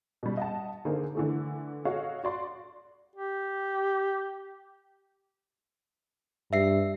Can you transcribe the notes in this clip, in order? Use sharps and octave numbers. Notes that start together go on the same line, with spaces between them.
B2 G3
D#5 F#5 A5
D3 A#3 D#4 G#4 C5
D3 E3 A3
F#4 A4 C#5 D#5 F5
F#4 D5 C6
G4
G2 E5 C7